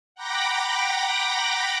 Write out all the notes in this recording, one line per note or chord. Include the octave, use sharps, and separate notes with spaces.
F#5 G5 A#5 B5 D6 A#6